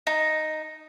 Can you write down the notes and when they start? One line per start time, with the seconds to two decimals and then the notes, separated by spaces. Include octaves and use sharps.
0.07 D#4